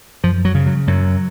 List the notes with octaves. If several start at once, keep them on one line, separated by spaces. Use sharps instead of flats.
F#2 F3
F#3
C#3
F#3
F#2 F#3